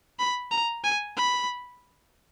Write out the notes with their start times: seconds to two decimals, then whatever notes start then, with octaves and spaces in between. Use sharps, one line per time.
0.19 B5
0.51 A#5
0.84 G#5
1.17 B5